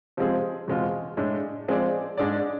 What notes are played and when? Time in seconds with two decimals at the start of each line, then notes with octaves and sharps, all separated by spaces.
0.17 C3 F3 G#3 C4 G#4
0.67 E2 B2 G#3 C4 F4
1.17 A2 G#3 D4
1.68 F3 G#3 C4 G#4 D5
2.17 G#2 G#3 D4 G#4 D5